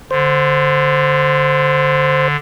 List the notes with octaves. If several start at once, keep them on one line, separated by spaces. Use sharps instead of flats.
D3 C5